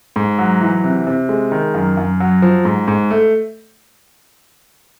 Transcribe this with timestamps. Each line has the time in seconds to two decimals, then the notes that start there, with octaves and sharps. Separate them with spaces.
0.16 G#2
0.38 F#3
0.61 E3
0.84 C3
1.07 C3
1.29 G#3
1.52 D#3
1.74 F#2
1.97 F#2
2.20 F#3
2.42 F3
2.65 G#2
2.88 G#2
3.11 A3